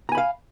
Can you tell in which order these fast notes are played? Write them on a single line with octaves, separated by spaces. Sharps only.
A#5 G#5 B5 F5